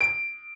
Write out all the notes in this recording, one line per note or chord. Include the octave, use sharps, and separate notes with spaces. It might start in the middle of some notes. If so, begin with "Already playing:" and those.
D7